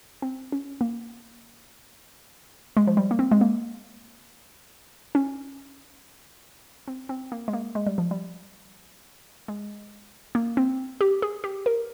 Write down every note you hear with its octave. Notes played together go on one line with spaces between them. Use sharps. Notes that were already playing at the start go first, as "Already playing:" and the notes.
C4
C#4
A#3
G#3
F3
G3
A#3
C4
G#3
A#3
C#4
C4
C4
A#3
G#3
A#3
G#3
G3
F3
G3
G#3
A#3
C4
G4
G#4
G4
A#4